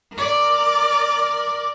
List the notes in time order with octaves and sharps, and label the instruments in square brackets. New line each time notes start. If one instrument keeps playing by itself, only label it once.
[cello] A#4 D5